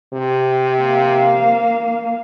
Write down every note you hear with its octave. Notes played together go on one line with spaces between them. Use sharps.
C3
A#3 F5